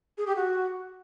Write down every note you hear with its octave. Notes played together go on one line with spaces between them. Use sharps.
G#4
G4
F#4